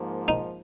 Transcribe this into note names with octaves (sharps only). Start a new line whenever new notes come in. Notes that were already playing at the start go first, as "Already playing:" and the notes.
Already playing: G#2 F3 A#3
D#4